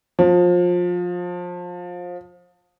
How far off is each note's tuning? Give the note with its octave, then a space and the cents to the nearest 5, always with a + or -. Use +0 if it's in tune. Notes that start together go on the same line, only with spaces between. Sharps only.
F3 +25